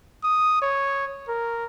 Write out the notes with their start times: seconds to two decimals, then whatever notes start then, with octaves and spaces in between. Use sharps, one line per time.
0.24 D#6
0.62 C#5
1.29 A#4